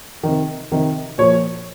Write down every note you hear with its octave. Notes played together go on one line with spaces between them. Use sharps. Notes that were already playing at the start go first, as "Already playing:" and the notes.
C3 D#3
C3 D#3
A#2 F3 C#5